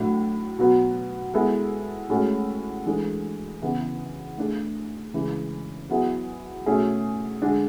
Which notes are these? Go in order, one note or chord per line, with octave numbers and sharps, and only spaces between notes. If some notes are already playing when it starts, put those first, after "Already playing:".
Already playing: A2 F#3 A3 D4
B2 F#3 B3
G#3 B3 E4 A4
A2 G#3 C#4 F#4 A4
E3 G#3 D4 A4
C#3 E3 B3 E4 G#4
A3 D4 G#4
C#3 E3 G#3
F#3 B3 E4 G#4
B2 A3 C#4 G#4
D3 G#3 D4